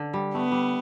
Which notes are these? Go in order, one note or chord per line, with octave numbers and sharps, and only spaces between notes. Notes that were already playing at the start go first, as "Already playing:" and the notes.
Already playing: D3
G3
A3 B3
G3